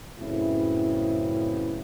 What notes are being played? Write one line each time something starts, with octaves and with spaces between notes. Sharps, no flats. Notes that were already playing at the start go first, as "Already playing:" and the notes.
F#2 A2 C#3 B3 C4 E4